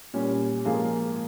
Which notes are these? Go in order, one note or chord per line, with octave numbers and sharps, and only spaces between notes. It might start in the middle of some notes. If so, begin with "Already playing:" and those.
A#2 G3 C#4
G#2 F3 A#3 F4 G#4